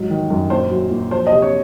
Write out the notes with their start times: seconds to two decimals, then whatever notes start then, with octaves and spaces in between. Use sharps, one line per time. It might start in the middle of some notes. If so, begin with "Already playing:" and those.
Already playing: G#2 F#3
0.10 D#3
0.30 F#2
0.50 A#2 C5
0.71 F#3
0.91 A#2
1.11 F3 C5
1.27 D#5
1.32 C3
1.42 C#5